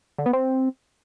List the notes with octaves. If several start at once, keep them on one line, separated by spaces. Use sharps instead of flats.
D3
B3
C4